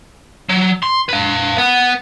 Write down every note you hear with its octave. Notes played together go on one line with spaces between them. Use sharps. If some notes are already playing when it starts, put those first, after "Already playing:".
F#3
C6
B4 F5
B3